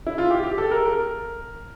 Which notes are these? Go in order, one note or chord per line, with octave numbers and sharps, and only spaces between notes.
E4
F4
G4
G4
A4
A#4
A#4